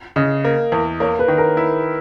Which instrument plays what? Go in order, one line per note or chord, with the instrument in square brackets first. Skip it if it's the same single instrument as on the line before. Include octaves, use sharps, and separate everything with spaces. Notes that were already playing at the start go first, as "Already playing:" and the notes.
[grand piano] C#3 [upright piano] D#5
[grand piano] A#3
E2
[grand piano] A#3 [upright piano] C#5
[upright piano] B4
[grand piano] D#3
[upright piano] A#4
[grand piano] E4